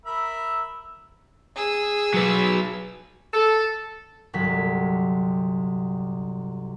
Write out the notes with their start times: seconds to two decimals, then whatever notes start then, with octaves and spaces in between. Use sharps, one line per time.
0.06 A#4 E5 B5
1.56 G#4 E6
2.14 F#3 B4
3.33 A4
4.33 G1 C2 F#3 B6